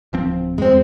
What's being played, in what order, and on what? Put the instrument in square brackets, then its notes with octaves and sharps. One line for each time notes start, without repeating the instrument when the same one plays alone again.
[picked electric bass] D1 F3 C4
[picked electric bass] E2 [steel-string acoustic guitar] G#3 C4